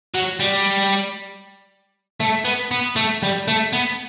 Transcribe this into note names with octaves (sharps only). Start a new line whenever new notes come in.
F#3
G3
A3
B3
B3
A3
G3
A3
B3